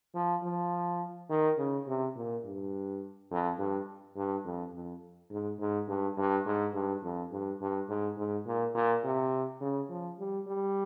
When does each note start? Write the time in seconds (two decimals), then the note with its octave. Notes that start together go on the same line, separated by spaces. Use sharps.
0.15 F3
0.43 F3
1.30 D#3
1.58 C#3
1.87 C3
2.16 A#2
2.45 G2
3.31 F2
3.58 G2
4.16 G2
4.45 F2
4.74 F2
5.30 G#2
5.59 G#2
5.88 G2
6.17 G2
6.46 G#2
6.74 G2
7.03 F2
7.31 G2
7.61 G2
7.89 G#2
8.17 G#2
8.46 A#2
8.75 A#2
9.04 C3
9.61 C#3
9.90 F3
10.19 G3
10.47 G3